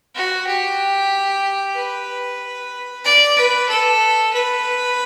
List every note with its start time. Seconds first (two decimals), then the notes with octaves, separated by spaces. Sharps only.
0.15 F#4
0.47 G4
1.76 B4
3.05 D5
3.36 B4
3.69 A4
4.33 B4